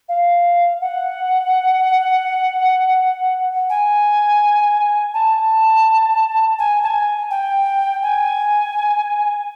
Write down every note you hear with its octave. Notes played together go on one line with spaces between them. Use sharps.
F5
F#5
G#5
A5
G#5
A5
G#5
G5
G#5